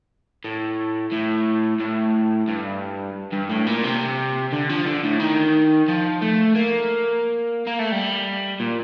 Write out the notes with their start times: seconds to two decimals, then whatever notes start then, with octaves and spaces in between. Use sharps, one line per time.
0.44 A2
1.12 A2
1.80 A2
2.48 G2
3.33 G2
3.50 A2
3.66 A#2
3.84 C3
4.52 D3
4.69 F3
4.85 D3
5.03 A2
5.20 D#3
5.88 F3
6.22 A3
6.56 A#3
7.67 A#3
7.79 A3
7.92 G3
8.60 A#2